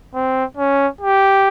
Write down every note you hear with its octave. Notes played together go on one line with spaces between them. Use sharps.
C4
C#4
G4